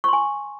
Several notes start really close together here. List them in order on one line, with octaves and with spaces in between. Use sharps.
C#6 C6 G#5